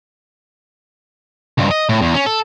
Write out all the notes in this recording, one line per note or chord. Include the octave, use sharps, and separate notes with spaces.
C#2 G2
D#5
A2
E2
C#4
A4